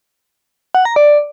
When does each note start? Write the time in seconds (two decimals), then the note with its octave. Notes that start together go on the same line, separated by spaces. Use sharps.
0.75 F#5
0.85 A#5
0.96 D5